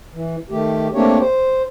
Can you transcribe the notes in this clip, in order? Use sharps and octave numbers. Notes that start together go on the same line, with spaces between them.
E3
D#3 A3 G4
A3 A#3 C4 D4 G4 C#5
C5